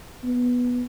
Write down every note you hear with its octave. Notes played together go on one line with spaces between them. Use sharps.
B3